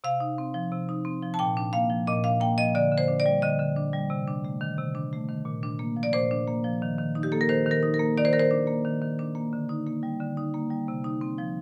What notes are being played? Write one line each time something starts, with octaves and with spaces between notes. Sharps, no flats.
C3 F5
D#4
C4
F3
C3
D#4
C4
F3
A5
A#2 G5
D4
A#3 F5
F3
A#2 D#5
D4 F5
A#3 G5
F3 D#5
D3 D5
D3
C5
D4
D5
G3
D3 D#5
D3
D4
G3
C3
D4
A3
D#3
C3
D4
A3
D#3
A#2
D4
A#3
F3
D5
A#2 C5
D4
A#3
F3
D#3
D#3
D#4
G4
A#3 A4
A#4
D#3 C5
D#3 A#4
D#4
A#4
A#3
D#3 D5
C5
D#3 A#4
C5
D4
A#3
D#3
D#3
D4
A#3
D3
D#4
A#3
G3
D3
D#4
A#3
G3
C3
D#4
C4
F3